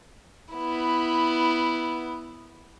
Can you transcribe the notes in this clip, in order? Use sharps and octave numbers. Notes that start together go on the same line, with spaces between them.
B3 E4